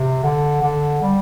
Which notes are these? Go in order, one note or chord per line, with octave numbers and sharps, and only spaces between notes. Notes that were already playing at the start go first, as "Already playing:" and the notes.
Already playing: C3
D3
D3
G3